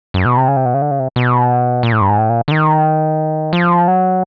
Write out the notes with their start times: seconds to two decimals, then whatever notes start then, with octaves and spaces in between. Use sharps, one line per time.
0.14 F#2
0.25 B2
0.37 C3
0.48 C#3
0.57 C3
0.65 B2
0.74 C#3
0.82 D3
0.91 C#3
0.99 C3
1.16 B2
1.83 A#2
1.92 A2
2.01 G2
2.09 G#2
2.18 A2
2.30 A#2
2.48 D3
2.51 D#3
3.53 F3
3.88 F#3